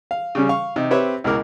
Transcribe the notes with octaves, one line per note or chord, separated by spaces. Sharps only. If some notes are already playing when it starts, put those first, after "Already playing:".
F5
C#3 G3 C#4
F5 C#6
C3 D#4
C4 G4 B4 C#5 E5
C#2 B2 E4 A#4 D6